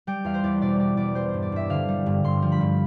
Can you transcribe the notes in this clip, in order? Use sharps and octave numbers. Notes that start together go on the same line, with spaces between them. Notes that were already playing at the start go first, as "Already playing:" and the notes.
G3 G5
E2 F5
C5
E2 D5
B2 D5
G3 D5
E2 D5
G3 C5
C5
G2
D5
G2 E5
D3 F5
G3
G2
G2 C6
F3
B5
G2